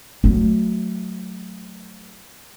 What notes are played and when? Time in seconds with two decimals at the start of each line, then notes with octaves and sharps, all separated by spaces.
0.24 F#3 A3